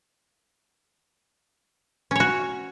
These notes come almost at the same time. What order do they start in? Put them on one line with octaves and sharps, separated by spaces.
C#4 C#5 F#4